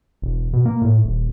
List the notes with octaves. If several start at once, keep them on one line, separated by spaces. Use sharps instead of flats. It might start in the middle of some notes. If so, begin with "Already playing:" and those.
E1
B2
A#3
A2
D#1